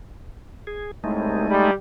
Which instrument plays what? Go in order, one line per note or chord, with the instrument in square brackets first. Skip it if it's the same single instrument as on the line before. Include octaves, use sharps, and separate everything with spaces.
[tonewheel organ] G#4
[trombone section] C2 A2 [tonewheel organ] G#3 A3 D#4
[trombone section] G3